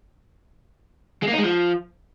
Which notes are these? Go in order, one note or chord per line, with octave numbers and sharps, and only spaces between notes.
G#3
A#3
D#4
G#3
F3